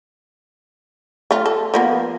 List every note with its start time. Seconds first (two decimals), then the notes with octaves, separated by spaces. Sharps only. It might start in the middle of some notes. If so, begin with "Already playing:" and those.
1.31 A3 F4
1.46 A4
1.74 F3 A#3 B3